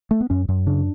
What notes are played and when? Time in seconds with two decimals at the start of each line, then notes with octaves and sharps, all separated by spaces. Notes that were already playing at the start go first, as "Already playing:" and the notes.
0.11 A3
0.21 B3
0.30 F#2 C#4
0.48 F#2
0.67 C#3 D4